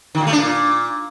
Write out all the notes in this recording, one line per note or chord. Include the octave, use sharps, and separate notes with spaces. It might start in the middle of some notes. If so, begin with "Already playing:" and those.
D#3
A#2
A3
D4
A#2